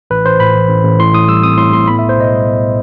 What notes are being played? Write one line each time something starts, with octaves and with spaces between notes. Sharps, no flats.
A1 B4
A1 C5
A2 B5
E3
A1
A1
A2 C6
A2 D#6
G3 E6
C4 D#6
A2 C6
A2 C6
B3 B5
E5
B1
C5
B2 D#5
G3
B3